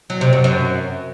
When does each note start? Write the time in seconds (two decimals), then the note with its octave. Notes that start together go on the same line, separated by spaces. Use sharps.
0.10 F#3
0.21 C3
0.33 F#2
0.44 F#2